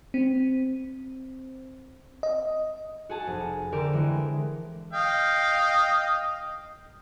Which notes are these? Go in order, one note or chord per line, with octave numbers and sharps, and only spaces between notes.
C4
D#5
F#4 G#4 A5
F1
D3 G4 A#4 D6 D7 E7
E3 G#3
D#5 F5 G5